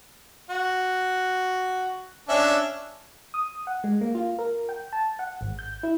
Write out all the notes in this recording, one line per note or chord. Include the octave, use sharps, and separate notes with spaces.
F#4
C#4 D4 E5
D#6
F#5
G#3
A#3
F4
A#4
G5
A5
F#5
G#1
G6
E4